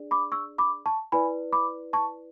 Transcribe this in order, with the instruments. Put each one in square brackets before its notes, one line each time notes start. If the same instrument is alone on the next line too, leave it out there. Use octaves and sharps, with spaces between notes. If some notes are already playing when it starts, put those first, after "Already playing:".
Already playing: [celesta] D4 G#4 D5
B5 D6
C#6 E6
B5 D6
A5 C#6
E4 B4 D5 G#5 B5
B5 D6
A5 C#6